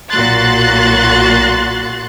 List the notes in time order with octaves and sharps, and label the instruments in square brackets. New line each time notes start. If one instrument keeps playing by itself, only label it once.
[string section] B1 A#2 F#4 C6 F#6 A6